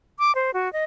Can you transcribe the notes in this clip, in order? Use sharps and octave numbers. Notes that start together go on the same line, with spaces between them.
D6
C5
F#4
D#5